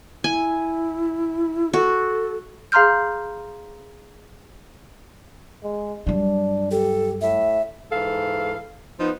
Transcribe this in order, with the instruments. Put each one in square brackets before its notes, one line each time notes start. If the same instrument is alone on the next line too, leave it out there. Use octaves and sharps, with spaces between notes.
[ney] E4 [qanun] G#5
[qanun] F#4 [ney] A4
[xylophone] G#4 F5 A#5 C6 F6 G6
[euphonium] G#3
[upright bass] G2 F#3 [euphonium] D4
[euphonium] G4 [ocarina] A4
[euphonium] A2 [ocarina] E5
[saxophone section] G#2 E3 A4 F5
F3 B3 D#4